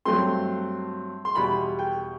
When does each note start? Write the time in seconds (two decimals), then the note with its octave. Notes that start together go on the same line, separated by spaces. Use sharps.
0.05 G2 F#3 A3 C4 C6
1.25 C6
1.35 E2 B2 G3 B5
1.79 G5